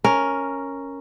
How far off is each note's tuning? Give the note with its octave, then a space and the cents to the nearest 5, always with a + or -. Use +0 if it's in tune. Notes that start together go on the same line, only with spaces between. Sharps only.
C#4 +0 A#4 +0